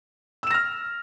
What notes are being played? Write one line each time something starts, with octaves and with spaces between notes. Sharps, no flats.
E6 F6 A#6 E7